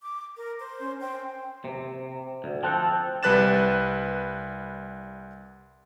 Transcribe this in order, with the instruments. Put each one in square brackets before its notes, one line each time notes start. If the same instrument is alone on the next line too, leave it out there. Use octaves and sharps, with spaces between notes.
[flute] D6
A#4
C5
[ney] C#4
[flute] C5 [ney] G5
[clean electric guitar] C3
D2
[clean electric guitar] F3 C4 A4 [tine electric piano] G5 A5 F#6
[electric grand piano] C2 G3 B4 F#6 A6 E7